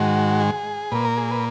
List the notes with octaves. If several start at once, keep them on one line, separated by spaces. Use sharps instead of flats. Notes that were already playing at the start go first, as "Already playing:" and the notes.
Already playing: G#2 D#3 G#3 F#4
G#4
A#2 A#3 B4
A#4
G#4
B4